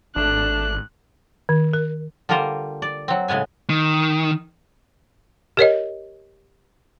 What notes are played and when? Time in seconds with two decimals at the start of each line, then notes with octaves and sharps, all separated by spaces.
0.16 G#1 A3 D4 F#6
1.49 D#3
1.73 A#4
2.29 D3 G3 A#3 F4 A#4 C5
2.82 D5
3.08 F#3 C4
3.28 A2 C#3 G#3 B3 G#5
3.70 D#3
5.57 G4 A#4 C#5 D#5